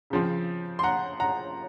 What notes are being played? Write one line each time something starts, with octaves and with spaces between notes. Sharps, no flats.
C#3 F3 C4
C6
F#5 A#5
F#5 A#5